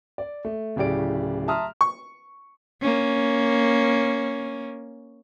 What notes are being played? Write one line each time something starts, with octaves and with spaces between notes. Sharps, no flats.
D5
A3
D1 A2 C#3 G4 D5 D7
E5 A5 A#5 C6 D#6 F6
C#6
A#3 C#4